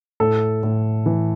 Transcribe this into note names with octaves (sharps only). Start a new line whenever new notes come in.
A2 A4
A2
E3